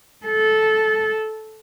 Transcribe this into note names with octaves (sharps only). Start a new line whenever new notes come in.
A4